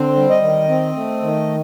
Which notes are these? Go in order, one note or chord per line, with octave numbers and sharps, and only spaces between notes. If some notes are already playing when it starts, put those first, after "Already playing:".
Already playing: D3 C4 C5
G3
D#5
D#3
C4
A3
D#3